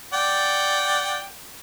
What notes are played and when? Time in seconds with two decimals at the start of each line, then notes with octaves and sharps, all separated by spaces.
0.14 D5 F#5 G5